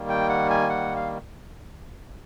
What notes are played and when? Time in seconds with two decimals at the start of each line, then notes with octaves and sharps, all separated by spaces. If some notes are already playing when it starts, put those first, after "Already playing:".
Already playing: D#3 G3 A#3
0.09 G5
0.29 F#5
0.50 G#5
0.69 F#5
0.96 F5